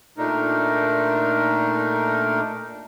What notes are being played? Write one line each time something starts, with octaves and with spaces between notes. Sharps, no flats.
A#2 A3 D4 D#4 A#4